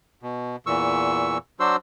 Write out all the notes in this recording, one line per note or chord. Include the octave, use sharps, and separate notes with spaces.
B2
E2 A#2 E3 C#6 E6
F#3 D4 F#4 C5 C6 E6